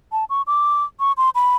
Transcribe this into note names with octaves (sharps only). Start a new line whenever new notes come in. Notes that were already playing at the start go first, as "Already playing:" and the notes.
A5
C#6
D6
C#6
C6
B5